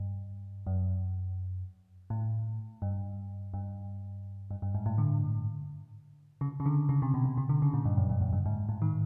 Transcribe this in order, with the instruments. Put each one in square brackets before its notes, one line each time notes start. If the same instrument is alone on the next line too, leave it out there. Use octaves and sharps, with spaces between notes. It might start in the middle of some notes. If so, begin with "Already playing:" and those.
Already playing: [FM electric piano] G2
F#2
A2
G2
G2
G2
G2
G#2
A2
D3
C#3
C#3
D3
C#3
C3
B2
B2
C3
D3
C#3
A#2
G2
F#2
G2
F#2
G2
G#2
A2
D#3